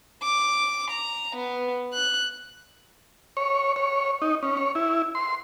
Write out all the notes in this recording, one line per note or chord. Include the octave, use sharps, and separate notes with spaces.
D6
A#5
B3
F#6
C#5
C#5
D#4
C#4
C#5
E4
C6